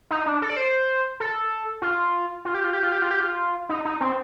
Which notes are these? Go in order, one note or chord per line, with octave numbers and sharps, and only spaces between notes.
D#4
D4
A4
D5
C5
A4
F4
F4
G4
F4
G4
F4
G4
F4
G4
F4
D#4
D#4
C4